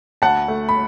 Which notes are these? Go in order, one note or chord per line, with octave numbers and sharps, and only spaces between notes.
D2 F#5 A5
A3
B5